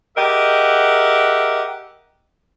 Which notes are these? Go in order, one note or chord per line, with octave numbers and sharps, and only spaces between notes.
G4 G#4 A#4 D#5 E5 F#5